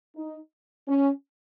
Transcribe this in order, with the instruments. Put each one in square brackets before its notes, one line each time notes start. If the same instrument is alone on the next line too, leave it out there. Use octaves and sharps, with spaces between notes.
[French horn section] D#4
C#4